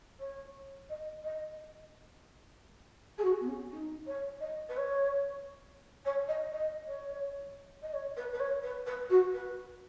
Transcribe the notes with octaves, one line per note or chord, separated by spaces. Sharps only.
C#5
D#5
D#5
G#4
F#4
B3
C#4
D#4
C#5
D#5
B4
C#5
C#5
D#5
D#5
C#5
D#5
C#5
B4
B4
C#5
B4
B4
F#4
B4